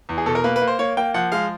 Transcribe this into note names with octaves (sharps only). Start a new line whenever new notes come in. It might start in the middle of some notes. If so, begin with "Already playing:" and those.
E2
G#4
B2 A4
A#4
A#3 B4
B4
A#3
C5
A#3 C#5
A#3 G5
F3 F#5
G#3 F5